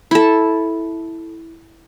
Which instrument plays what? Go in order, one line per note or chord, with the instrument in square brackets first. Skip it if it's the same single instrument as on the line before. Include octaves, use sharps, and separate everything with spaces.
[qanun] E4 A4